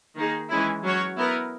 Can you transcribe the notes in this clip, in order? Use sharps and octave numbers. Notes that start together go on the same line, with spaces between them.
D#3 A#3 D#4 G#4
E3 G#3 C#4 E4
F#3 C#4 F#4 C#5
B3 E4 A#4